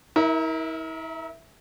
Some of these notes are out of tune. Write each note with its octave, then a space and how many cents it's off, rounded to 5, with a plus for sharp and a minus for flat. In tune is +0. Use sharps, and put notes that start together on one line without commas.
E4 -40 A#4 +10 E5 +0